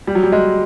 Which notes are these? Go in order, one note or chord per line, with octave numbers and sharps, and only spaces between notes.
G3
F#3
G3
G#3